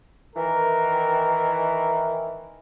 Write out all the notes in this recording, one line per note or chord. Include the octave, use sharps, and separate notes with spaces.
D#3 E3 A#4